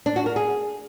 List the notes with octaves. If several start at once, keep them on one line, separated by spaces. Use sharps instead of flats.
D4
F#4
A#4
G#4